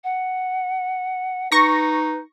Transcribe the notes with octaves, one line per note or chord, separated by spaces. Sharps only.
F#5
D#4 B4 C#6 A#6